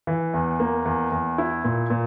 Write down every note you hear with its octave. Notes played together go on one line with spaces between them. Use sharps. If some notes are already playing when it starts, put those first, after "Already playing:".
E3
E2
A#3
E2
E2
E4
A#2
A#2